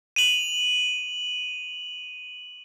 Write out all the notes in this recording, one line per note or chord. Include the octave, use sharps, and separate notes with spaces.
D#7 F7 F#7